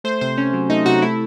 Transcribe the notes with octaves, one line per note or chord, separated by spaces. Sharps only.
A3 C5
C3 C5
C3 C#4
F#3
A3 D#4
C3 F#4
A3 E4